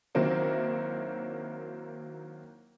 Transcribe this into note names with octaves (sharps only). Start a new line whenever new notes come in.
D#3 F#3 A#3 C4 E4